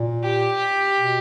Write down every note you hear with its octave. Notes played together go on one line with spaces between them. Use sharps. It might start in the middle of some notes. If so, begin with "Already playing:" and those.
Already playing: A#2
G4
B2